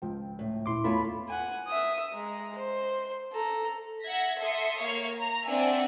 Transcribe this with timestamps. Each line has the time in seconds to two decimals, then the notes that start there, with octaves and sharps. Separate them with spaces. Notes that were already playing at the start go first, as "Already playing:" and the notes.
0.02 C#2 F3 G5
0.39 A2
0.66 D#1 E4 C6 D6
0.84 E2 A3 F4 C#5 B5
1.29 F#5 G#5
1.67 E5 D#6
2.13 G#3 A#5
2.58 C5
3.32 A4 A#5
4.04 E5 F#5 G#6 A#6 B6
4.39 A4 E5 C6 D#6 C#7
4.81 A#3 C#5 F5
5.18 A#5
5.48 C4 D4 D5 E5 F#5 G#5